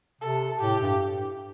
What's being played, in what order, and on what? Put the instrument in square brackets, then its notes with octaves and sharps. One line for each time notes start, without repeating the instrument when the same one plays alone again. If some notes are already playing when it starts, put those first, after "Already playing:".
[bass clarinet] C3 [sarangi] A4
[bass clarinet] A2 [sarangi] G4
[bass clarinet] G2